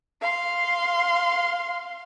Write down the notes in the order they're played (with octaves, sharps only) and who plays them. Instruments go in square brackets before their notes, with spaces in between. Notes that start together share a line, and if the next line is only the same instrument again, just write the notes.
[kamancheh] F5 C6